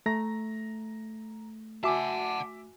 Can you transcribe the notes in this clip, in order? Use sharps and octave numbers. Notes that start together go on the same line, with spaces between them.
A3 A#5 A#6
F#4 E5 F#5 G#5 A5 D6